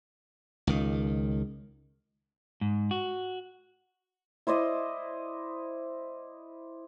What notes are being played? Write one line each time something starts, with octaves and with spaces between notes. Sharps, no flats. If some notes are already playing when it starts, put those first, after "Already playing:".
C#2 D#3
G#2
F#4
E4 C5 D5 D#5